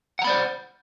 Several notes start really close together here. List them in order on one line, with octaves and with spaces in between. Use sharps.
F#5 A#5 B5 D5 C5